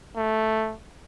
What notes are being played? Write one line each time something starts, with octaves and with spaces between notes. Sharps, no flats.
A3